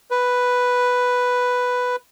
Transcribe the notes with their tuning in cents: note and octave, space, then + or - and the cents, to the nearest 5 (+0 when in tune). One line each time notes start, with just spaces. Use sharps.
B4 +0